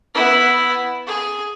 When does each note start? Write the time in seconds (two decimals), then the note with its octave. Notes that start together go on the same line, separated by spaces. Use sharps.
0.15 B3 E4
1.07 G#4